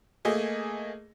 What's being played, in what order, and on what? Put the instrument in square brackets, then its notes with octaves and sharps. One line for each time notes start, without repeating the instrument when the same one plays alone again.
[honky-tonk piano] A3 A#3 G#4 D#5